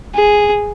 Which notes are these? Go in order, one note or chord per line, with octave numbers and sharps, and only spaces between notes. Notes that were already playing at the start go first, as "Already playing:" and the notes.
G#4